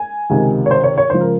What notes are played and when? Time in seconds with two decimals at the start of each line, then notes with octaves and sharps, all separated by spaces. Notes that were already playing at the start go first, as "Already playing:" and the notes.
Already playing: G#5
0.30 C#2 C3 D#3
0.66 C#5
0.71 C5
0.84 C#5
0.98 C#5
1.10 C#2 C#3 F3 C5
1.21 A#4